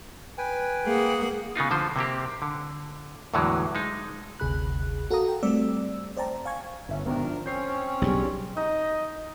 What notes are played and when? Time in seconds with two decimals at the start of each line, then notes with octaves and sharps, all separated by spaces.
0.38 B4 G5 G#5
0.86 A#3 G#4 F#5
1.55 C#3 B3 D#4 F4
1.71 D3 F3 C5
1.96 C3 A#3 C4 G4
2.42 D3
3.34 E2 A2 D3 E3 F#3 G#3
3.75 G#3 D#4
4.40 G1 D2 C3 G#4 B5 F#6
5.11 F#4 A4 A#4 F5 A#5 D#6
5.28 G5
5.43 G3 A3 C4 D5 E6
6.17 C5 D5 G5 A5 A#5
6.45 F5 G#5 C#6 G#6
6.88 G1 C#4 E5
7.06 G#1 B2 D#3 D4 A#4
7.24 F3
7.46 C4 C#4 C#5 G6 C7
8.02 B1 G2 C#3 G3
8.57 D#4 D#5